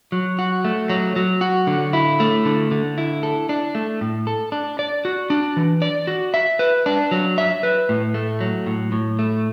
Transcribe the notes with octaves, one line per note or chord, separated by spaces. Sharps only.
F#3
F#4
A3
F#3
F#3
F#4
D3
E4
A3
D3
D3
E4
A4
D4
A3
A2
A4
D4
D5
F#4
D4
E3
D5
F#4
E5
B4
D4
F#3
E5
B4
A2
A3
F#3
A2
A2
A3